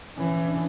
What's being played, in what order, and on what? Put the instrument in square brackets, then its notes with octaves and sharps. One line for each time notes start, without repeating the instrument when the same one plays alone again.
[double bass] E3 [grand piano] C#4
[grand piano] D4